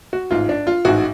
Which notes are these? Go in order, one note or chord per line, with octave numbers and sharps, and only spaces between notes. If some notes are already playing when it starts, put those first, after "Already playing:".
F#4
A1 G#2 F4
D4
F4
A1 G#2 F#4